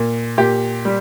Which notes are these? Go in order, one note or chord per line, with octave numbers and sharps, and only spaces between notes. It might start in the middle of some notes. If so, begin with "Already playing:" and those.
Already playing: A#2
A#2 G4
G3